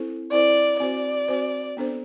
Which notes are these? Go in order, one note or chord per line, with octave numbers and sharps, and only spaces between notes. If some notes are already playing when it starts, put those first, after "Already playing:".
Already playing: C4 E4 A4 C5
C4 E4 A4 C5 D5
C4 F#4 C5 D5
C4 F#4 C5
B3 D4 A4 C5